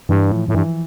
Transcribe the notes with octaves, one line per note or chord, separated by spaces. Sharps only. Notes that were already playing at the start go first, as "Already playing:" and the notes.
G2 E3
A2 F3
A2
G2 E3